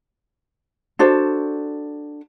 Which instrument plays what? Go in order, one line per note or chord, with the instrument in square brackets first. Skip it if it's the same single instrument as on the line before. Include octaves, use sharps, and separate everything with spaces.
[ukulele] D4 F#4 A4 C5